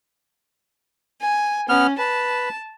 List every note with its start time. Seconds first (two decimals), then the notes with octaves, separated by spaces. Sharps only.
1.21 G#5
1.69 B3 C#4 F6
1.98 B4 A5